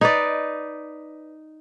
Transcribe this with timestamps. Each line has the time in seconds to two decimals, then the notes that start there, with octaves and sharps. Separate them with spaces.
0.01 D#4 B4 D5